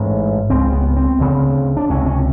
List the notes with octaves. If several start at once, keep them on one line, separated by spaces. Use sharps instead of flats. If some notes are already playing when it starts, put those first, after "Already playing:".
Already playing: A1 G#2 C#4
C#2 C#3 C4
B3
C4
D2 C#3
D4
C#2 C3 C#4
C#4